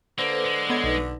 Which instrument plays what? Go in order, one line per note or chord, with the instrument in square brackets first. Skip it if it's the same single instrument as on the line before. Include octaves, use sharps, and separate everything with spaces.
[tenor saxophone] D3 [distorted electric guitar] A#3 [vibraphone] A4 B4 C5
[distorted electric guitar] G#3
[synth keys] B3 G#6 [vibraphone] A4 C#5 D#5
[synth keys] B1 [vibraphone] D#4 B4